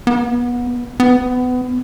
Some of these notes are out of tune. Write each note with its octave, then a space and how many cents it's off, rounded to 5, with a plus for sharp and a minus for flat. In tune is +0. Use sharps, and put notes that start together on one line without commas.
B3 -25
B3 +25